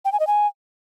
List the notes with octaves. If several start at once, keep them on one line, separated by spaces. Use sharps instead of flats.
G5
G#5
D#5
G#5